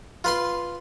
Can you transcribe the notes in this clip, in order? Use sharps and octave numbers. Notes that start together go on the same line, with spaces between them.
F4 B4 C6